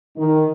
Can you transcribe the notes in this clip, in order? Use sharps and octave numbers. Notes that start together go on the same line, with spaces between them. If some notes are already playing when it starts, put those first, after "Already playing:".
D#3